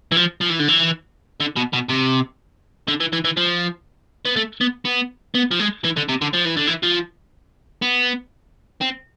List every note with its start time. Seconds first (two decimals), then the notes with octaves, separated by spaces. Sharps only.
0.12 E3
0.17 F3
0.41 F3
0.50 E3
0.60 D3
0.69 E3
1.40 D3
1.56 B2
1.73 B2
1.89 C3
2.88 D3
3.00 E3
3.13 E3
3.25 E3
3.37 F3
4.25 B3
4.36 A3
4.61 B3
4.85 B3
5.35 B3
5.51 F3
5.60 G#3
5.84 E3
5.97 D3
6.09 C3
6.21 D3
6.33 F3
6.45 E3
6.57 D3
6.67 E3
6.83 F3
7.82 B3
8.81 C4